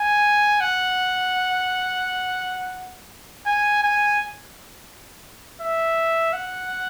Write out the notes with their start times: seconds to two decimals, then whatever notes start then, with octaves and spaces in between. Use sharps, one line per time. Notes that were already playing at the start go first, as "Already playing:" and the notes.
Already playing: G#5
0.61 F#5
3.47 G#5
3.83 G#5
5.62 E5
6.33 F#5